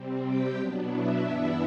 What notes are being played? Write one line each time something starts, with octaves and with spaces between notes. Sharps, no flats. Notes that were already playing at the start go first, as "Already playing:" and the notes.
Already playing: C3 G3 C4
G4 G5
B2 F#3 B3 D4
E4 E5
G2 E3 B3 D4 E4 E5